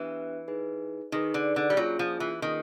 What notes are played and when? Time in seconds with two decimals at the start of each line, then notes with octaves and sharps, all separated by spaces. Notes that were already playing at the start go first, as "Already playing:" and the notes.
Already playing: E3 B3 D4 G4 B4 E5
0.48 D#4 G#4 B4
1.12 D#3 D#4 G#4 B4
1.34 D3
1.56 D3
1.70 G3
1.77 F#3 A#3 C#4 F4 G#4
1.99 F3
2.20 E3
2.42 D#3 A#3 C#4 F4 G#4